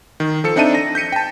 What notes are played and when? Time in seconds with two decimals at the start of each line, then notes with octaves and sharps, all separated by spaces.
0.20 D#3
0.44 F3 A4 C#7
0.56 C4 D4 D#4 E5 A5 D#7
0.75 A#6
0.95 G6 B6 C#7 D#7
1.12 G5 A5